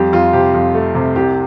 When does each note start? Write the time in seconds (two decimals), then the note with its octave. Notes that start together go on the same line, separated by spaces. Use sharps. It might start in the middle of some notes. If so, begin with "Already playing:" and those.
Already playing: F2 G3 G4
0.13 F2 F4
0.33 C3 G4
0.54 F2
0.75 A3
0.95 C3
1.16 C2 G4